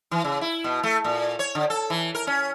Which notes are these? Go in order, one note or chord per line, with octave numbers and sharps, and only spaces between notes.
E3
C#3
E4
B2
A3
A#2
C#5
D3
A4
E3
A#4
C#4